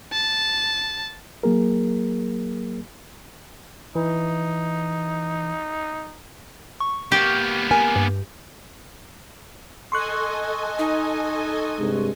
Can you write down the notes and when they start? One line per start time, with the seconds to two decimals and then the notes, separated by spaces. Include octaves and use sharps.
0.12 A5
1.43 F#3 A#3 G#4 A#4
3.95 E3 D#4
6.80 C#6
7.12 A#3 B3 G4
7.71 A#4 G#5
7.96 G2
9.92 A4 D#5 G#5 C6 C#6 F#6
10.79 D#4
11.78 G2 C3 G#3